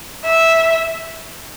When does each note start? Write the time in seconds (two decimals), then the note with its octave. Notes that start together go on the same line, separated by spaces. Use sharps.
0.25 E5